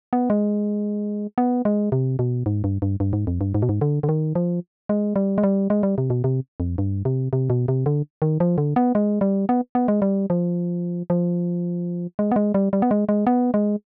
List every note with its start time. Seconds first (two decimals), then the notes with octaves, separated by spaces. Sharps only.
0.13 B3
0.30 G#3
1.38 B3
1.65 G#3
1.92 C3
2.19 B2
2.46 G#2
2.64 G2
2.82 G2
3.00 G2
3.13 G#2
3.27 F2
3.41 G2
3.55 G#2
3.62 B2
3.69 G#2
3.81 D3
4.03 D3
4.09 D#3
4.35 F3
4.89 G#3
5.16 G3
5.38 G#3
5.43 G3
5.70 G#3
5.83 G3
5.98 C3
6.10 B2
6.24 C3
6.60 F2
6.78 G2
7.05 C3
7.33 C3
7.50 B2
7.68 C3
7.86 D3
8.22 D#3
8.40 F3
8.58 D3
8.76 B3
8.95 G#3
9.21 G3
9.49 B3
9.75 B3
9.88 G#3
10.02 G3
10.30 F3
11.10 F3
12.19 G#3
12.31 B3
12.36 G#3
12.54 G3
12.73 G3
12.82 B3
12.91 G#3
13.09 G#3
13.27 B3
13.54 G#3